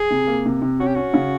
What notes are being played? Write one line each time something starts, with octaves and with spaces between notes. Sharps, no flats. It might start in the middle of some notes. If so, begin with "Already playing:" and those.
Already playing: G#4
C3
A#3
C3
C3
C#4 F#4
G4
C#4 F#4
C#3